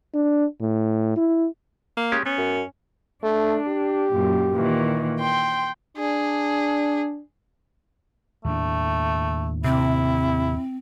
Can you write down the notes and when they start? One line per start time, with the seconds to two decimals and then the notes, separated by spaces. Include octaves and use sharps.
0.14 D4
0.61 A2
1.17 E4
1.97 A#3
2.12 G#3 C#4 G4
2.26 B3 C#4
2.38 F#2
3.23 A3 D4
3.68 G4
4.11 F#2 A#2
4.55 A#2 D#3 E3
5.20 G5 C6
5.98 D4 G#4
8.45 D#2 A2 A3 D4
9.64 C3 C4 E4